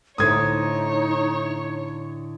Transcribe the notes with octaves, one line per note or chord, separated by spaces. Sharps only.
A2 D3 D#4 C5 C#5 D#6 G#6